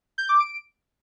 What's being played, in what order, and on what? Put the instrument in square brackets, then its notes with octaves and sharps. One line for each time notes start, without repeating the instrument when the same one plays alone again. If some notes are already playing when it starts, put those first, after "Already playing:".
[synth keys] G6
D6
D7